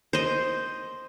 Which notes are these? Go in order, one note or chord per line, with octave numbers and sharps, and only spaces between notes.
C5 D#5